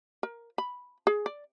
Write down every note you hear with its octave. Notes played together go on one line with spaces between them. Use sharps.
A#4
B5
G#4
D5